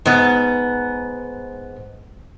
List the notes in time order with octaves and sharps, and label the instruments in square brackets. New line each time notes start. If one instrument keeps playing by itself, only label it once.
[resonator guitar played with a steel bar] G#2 B3